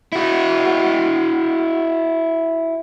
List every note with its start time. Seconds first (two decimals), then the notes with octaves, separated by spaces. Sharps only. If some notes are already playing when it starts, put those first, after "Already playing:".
0.12 E4 F#4